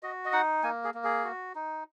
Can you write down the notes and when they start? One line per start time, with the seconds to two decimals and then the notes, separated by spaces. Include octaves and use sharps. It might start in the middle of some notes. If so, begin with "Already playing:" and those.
0.03 F#4 D#5
0.25 D#5
0.33 D#4 F#5
0.63 A#3 G#5
0.84 G#4
0.94 A#3
1.04 G#4
1.24 F#4
1.55 D#4